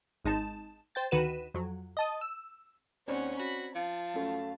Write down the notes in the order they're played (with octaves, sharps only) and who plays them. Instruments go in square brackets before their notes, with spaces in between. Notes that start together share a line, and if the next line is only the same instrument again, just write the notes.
[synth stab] G#1 G#3 D#4 A5 E7
C5 G5 A6
D2 D#3 F#4 B4 D#7 E7
F2 F#3
D#5 A5 D#6
E6
[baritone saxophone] D#2 [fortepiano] C4 C#5 D5 [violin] C#4 F#5
[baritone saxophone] F#4 [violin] B5
[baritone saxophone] F3 [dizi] F5 [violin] A5
[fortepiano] F#2 A3